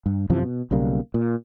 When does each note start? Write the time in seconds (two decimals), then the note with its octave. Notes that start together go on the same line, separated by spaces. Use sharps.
0.06 G2
0.30 F#2 C3 E3 F3
0.43 B2
0.71 B1 C#3 G3 A#3
1.14 A#2